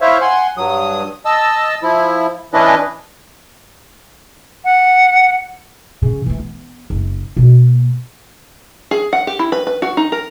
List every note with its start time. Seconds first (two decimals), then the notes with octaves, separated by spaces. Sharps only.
0.01 E4 C5 C#5 E5 F5
0.21 F#5 G#5 C6
0.57 G2 F#3 D#6
1.25 D#5 A5 E6
1.83 F3 E4
2.53 E3 C#4 D4 E4 B4 D#5
4.65 F#5
6.02 C#3
6.26 E3 A3
6.39 B3
6.90 F#1
7.37 B2 A#3
8.91 G#4
9.13 F#5
9.27 G4
9.39 E4
9.52 B4
9.67 B4
9.82 F#4
9.97 D#4
10.12 A#4